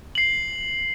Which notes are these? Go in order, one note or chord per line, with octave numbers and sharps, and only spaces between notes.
C7 F#7